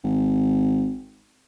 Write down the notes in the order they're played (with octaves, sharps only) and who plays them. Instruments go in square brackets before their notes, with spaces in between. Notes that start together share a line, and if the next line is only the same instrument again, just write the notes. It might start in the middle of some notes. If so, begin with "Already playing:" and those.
[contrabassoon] G#1